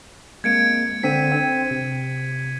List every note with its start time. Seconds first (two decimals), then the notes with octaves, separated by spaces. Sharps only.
0.44 G#3 A#3 C4 G#6 C#7 D7
1.03 D3 C4 D4 B6 D#7
1.32 C4
1.71 C3